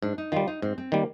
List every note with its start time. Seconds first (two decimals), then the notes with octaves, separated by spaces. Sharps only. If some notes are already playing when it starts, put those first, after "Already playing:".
0.03 G#2 D4
0.18 D#4
0.32 D#3 G3 F4
0.48 D#4
0.62 G#2 C4
0.78 C4
0.92 D#3 G3 A#3